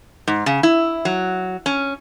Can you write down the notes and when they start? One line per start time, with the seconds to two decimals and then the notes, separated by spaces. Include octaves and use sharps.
0.27 G#2
0.46 C#3
0.63 E4
1.05 F#3
1.66 C#4